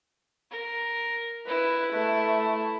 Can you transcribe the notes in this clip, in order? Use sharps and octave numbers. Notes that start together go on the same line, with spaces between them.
A#4
E4 B4
A3